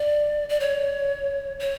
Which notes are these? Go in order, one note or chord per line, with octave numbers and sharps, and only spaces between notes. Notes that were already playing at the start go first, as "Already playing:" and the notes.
Already playing: D5
D5
C#5
C#5